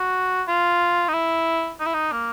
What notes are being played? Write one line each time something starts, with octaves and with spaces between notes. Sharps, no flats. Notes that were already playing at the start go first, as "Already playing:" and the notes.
Already playing: F#4
F4
D#4
E4
D#4
E4
D#4
A#3